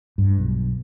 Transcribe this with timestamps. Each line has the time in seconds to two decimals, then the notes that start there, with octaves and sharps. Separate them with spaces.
0.18 G2
0.38 B1